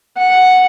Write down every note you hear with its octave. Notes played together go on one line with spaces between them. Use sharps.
F#5